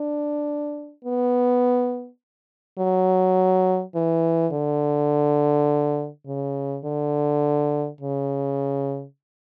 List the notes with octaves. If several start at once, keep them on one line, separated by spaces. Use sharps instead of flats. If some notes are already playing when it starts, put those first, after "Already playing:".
Already playing: D4
B3
F#3
E3
D3
C#3
D3
C#3